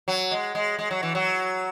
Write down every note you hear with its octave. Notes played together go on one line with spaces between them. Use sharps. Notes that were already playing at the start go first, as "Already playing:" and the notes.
F#3
G#3
G#3
G#3
F#3
E3
F#3